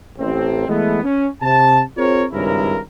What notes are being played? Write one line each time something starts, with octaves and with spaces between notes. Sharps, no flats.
A1 C4
E3 G#3 A3 B3
C#4
C3 A5
C4 F4 G#4 A#4 C#5
G#1 C#2 G2 C#3 E4 A#4